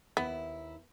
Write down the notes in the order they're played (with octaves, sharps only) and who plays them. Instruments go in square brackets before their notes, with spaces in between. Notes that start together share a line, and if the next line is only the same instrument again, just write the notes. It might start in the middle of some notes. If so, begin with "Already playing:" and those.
[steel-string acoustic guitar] D#2 E4 [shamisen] B3